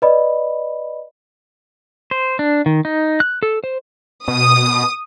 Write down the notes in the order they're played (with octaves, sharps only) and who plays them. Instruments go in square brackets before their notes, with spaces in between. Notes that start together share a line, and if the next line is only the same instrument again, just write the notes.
[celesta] B4 D5 D#5 B5
[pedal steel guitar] C5
D4
D#3
D#4
F#6
A4
C5
[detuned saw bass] B2 [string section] D#6